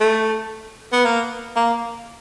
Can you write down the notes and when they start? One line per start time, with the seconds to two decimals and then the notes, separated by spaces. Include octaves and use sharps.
0.01 A3
0.92 B3
1.05 A#3
1.56 A#3